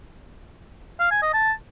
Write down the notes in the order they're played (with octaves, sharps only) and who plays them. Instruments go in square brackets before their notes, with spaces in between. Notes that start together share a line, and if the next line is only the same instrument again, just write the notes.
[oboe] F5
G#5
D#5
A5